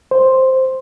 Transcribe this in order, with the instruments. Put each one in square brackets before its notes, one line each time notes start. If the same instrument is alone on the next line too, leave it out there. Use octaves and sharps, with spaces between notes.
[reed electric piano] C5